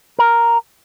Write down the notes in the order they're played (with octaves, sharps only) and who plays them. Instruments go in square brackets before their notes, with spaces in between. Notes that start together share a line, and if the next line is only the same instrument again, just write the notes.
[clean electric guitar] A#4